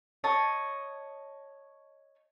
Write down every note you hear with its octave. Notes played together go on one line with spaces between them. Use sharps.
C#5 D#5 A5